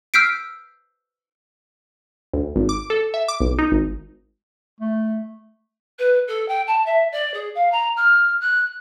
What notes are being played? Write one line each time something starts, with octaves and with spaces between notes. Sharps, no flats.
E6 F6 G6 B6 C7 D7
D2
G#1
D6
A4
E5
D6
B1
D#4
G#1
A3
B4
A4
G5
A5
E5
D5
G#4
F5
A#5
F6
F#6